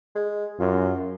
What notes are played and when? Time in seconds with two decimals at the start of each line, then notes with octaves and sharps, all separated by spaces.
0.15 G#3
0.59 F#2 F4